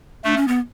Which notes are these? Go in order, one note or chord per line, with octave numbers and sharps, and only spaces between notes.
A3 D4
C#4
B3